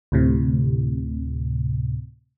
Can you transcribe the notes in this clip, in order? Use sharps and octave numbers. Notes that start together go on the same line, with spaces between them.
D2 A2 C3